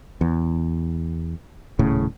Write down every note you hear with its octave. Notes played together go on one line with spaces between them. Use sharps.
E2
D#1 A2 C#3